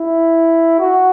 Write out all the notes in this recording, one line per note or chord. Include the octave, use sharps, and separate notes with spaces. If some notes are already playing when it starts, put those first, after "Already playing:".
Already playing: E4
F#4